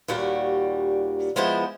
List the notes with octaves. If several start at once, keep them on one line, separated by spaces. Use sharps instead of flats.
D#2 A#2 G3 F#4 G4
F3 G#3 B3 E4 C5